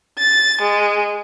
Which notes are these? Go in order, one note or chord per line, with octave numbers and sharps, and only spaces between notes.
A6
G#3